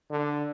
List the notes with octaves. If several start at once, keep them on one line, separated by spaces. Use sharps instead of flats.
D3